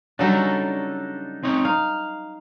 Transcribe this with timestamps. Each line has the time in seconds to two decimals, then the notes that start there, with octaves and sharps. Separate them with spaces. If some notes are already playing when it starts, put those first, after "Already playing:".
0.19 C#3 F#3 G3 D4 D#4 A4
1.44 C4 D#4 C#5
1.65 D#4 F5